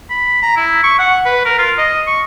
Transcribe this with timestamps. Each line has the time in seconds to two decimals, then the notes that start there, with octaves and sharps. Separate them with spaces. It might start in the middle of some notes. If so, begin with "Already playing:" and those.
0.10 B5
0.43 A#5
0.56 E4
0.83 C#6
0.99 F#5
1.25 B4
1.45 A#4
1.59 F4
1.78 D#5
2.07 C#6